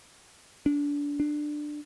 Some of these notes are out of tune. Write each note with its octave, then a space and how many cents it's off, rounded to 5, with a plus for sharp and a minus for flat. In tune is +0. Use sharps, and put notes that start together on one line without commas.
D4 -25
D4 +15